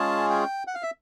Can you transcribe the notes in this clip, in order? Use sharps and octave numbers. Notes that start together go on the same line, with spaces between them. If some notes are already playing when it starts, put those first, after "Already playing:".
Already playing: G#3 C#4 F4 G#4 A5
G5
F#5
F5
E5